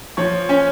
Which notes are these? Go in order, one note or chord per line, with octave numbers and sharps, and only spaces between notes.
F3 C#5
C#4